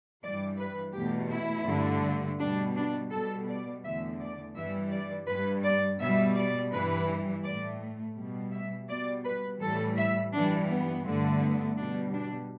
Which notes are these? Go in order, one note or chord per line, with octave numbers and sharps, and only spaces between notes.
G2 E3 G3 D5
B4
E2 B2 A3 G4
E4
G2 D3 A3
B2 G3 D4
D4
B2 G3 A4
D5
E2 D3 A3 E5
D5
G2 E3 G3 E5
D5
G2 G3 B4
D5
B2 G3 E5
D5
G2 E3 G3 B4
A2 A3 D5
B2 G3
E5
B2 G3 D5
B4
A2 E3 G3 A4
E5
G2 E3 G3 D4
B3
G2 D3 A3
B3
B2 G3 D4
D4